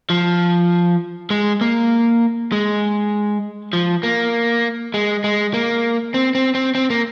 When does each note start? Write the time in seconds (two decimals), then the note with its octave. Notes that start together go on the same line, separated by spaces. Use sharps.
0.10 F3
1.30 G#3
1.61 A#3
2.52 G#3
3.73 F3
4.03 A#3
4.94 G#3
5.24 G#3
5.54 A#3
6.14 C4
6.35 C4
6.55 C4
6.75 C4
6.90 A#3